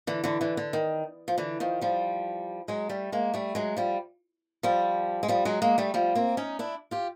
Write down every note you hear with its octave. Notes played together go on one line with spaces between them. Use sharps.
D3 E3
D3 E3
D3 E3
D3
D#3
F3
D3 E3
D#3 F3
F3 G3
F#3 G#3
G3 A3
G#3 A#3
G3 A3
F#3 G#3
F3 G3
F3 G3
G#3
F3 G3
F#3 G#3
G#3 A#3
G3 A3
F3 G3
A#3 C4
C#4 D#4
D4 E4
F4 G4